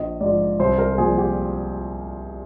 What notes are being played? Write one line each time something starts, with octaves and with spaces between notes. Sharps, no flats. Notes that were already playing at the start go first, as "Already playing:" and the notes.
Already playing: A#1 D#5
G#2 F3 D5
C2 C5
A#4
A#4
A#2 F3 G#4
G4